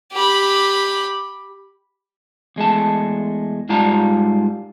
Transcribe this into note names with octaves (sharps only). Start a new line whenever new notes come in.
G4 B5
E2 G#3 A3 A5
G#2 G3 F4 A5 A#5